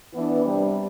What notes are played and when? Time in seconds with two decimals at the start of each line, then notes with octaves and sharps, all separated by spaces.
0.13 E3 B3 D4
0.43 C3 G3 D4